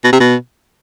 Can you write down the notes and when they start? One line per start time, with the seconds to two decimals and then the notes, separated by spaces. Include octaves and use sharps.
0.04 B2
0.13 C3
0.20 B2